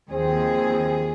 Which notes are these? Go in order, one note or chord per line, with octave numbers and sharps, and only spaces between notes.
D#2 F3 C4 G#4